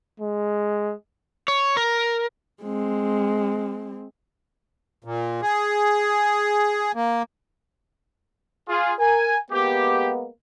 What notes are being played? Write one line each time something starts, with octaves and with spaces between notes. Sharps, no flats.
G#3
C#5
A#4
G#3 C4
A#2
G#4
A#3
F4 G#4
A#4 G#5
G#3 A#3 B3 G4